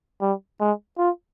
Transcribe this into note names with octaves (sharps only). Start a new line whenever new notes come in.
G3
G#3
F4